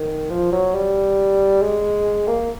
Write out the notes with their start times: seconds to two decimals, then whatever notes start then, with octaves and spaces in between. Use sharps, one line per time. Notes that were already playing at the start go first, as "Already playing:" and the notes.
Already playing: D#3
0.30 F3
0.52 F#3
0.75 G3
1.62 G#3
2.27 A#3